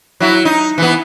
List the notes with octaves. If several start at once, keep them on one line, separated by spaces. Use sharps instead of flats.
F#3 E4
D#4
E3 B3